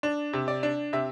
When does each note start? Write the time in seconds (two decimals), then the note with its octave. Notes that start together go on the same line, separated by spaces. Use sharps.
0.03 D4
0.33 C3
0.48 D5
0.63 D4
0.93 C3 E5